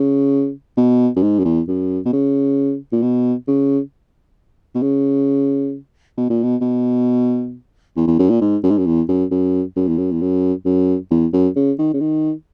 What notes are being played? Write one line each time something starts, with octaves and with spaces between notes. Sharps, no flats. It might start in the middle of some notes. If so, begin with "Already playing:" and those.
Already playing: C#3
B2
F#2
G#2
F#2
E2
F#2
B2
C#3
A#2
B2
C#3
B2
C#3
B2
A#2
B2
B2
E2
E2
F#2
A#2
G#2
F#2
G#2
F#2
E2
F#2
F#2
F#2
E2
F#2
E2
F#2
F#2
E2
F#2
C#3
D#3
C#3
D#3